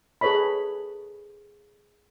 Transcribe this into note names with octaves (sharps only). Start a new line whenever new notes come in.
G#4 A4 B4 C#5 D#5 B5